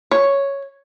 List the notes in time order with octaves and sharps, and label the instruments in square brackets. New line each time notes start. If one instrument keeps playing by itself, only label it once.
[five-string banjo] C#5